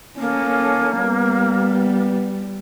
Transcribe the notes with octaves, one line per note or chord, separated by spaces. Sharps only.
A#3 C#4 A4
G3 B3